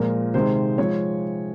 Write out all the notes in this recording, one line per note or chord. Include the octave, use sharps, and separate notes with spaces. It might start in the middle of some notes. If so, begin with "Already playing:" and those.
Already playing: A#2 F3 G#3 A#4
C3 D#3 G#3 C5
F3 G#3 C#5